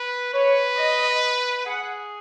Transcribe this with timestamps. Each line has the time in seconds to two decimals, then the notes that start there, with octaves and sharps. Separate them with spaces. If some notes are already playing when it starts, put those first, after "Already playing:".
Already playing: B4
0.34 B4 C#5
0.78 D#5
1.66 G#4 F#5